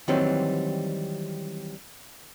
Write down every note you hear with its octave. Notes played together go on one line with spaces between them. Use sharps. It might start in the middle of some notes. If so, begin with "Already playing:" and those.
D#3 E3 F#3 G3 C4